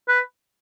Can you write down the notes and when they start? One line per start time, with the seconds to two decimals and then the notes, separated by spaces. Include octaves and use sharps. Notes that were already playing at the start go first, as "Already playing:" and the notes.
0.08 B4